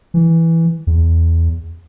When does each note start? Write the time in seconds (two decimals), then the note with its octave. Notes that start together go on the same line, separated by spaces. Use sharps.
0.14 E3
0.87 E2